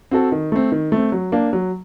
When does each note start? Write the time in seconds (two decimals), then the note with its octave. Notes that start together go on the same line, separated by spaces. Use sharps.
0.11 C4 F#4 A4
0.32 D#3
0.52 A3 C4
0.72 D#3
0.92 A3 C4
1.12 F#3
1.32 A#3 D4
1.53 F#3